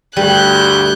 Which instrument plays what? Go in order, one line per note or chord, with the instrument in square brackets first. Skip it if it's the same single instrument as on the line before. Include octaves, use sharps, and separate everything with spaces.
[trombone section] D2 G2 [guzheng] G3 [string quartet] G#4 F#6 G6